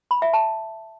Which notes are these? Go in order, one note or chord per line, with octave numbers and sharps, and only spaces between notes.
B5
E5
A5